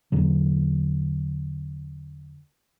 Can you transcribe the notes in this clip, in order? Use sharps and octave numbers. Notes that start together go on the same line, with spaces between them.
E2 D3 F#3